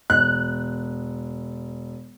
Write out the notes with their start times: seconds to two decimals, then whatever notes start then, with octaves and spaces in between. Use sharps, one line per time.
0.10 E1 F#6